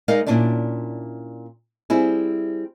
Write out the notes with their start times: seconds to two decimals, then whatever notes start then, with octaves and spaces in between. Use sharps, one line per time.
0.08 G#3 D#4 A#4 D5 F5
0.27 A#2 C#4 D4 E4 D5
1.90 G3 C4 E4 G#4